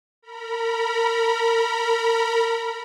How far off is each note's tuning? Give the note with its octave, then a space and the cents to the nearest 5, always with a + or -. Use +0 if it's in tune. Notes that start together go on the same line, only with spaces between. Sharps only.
A#4 -30 B5 -35